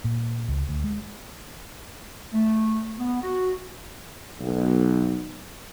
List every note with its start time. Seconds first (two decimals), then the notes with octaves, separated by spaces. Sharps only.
0.04 A#2
0.48 C#2
0.69 D2
0.84 G#3
2.34 A3
3.00 B3
3.22 F#4
4.40 B1